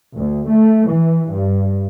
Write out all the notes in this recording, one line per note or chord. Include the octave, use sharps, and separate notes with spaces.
D2
A3
E3
G2